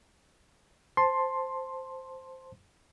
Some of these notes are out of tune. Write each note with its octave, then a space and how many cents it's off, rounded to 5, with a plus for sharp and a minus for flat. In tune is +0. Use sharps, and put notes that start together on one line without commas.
C5 +0 A5 +0 C6 +10